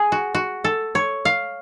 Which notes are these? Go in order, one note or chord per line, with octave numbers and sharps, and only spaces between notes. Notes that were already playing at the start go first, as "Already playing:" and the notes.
Already playing: G#4
F#4
F#4
A4
C#5
F5